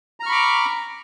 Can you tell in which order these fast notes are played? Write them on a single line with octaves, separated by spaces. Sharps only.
A#5 F6 C#6 B5 D6